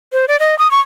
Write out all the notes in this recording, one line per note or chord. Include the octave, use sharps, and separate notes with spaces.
C5
D5
D#5
D#6
C#6